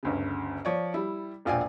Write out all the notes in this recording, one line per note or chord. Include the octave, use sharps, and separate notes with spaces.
G1 D2 C#3
F3 C#5 D5
G3 E4
E1 A#1 F4 D5 G5 G#5